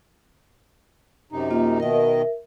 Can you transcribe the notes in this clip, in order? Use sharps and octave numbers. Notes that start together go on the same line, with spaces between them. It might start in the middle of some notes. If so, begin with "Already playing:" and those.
F#2 C3 D#4
A#3 F4
B2 D#3 A#4 D#5 E5